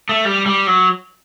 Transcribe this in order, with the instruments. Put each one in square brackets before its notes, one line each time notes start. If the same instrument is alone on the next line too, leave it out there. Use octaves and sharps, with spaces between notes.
[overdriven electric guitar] A3
G3
G3
F#3